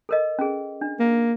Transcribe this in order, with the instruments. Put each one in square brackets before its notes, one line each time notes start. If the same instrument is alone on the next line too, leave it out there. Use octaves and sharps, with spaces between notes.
[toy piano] A4 A#4 D#5
C#4 G#4
D4
[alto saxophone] A#3